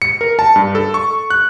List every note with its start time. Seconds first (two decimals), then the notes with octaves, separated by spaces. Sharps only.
0.02 C#7
0.21 A#4
0.39 A5
0.56 G2
0.75 A4
0.94 C#6
1.30 F#6